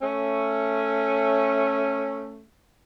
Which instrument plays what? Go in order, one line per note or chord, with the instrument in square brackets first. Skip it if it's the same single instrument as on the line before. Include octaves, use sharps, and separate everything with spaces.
[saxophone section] A3 C#4